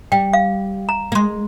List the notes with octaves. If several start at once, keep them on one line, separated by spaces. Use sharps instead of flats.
G3 G5
F5
A#5
A#3
G#3 C6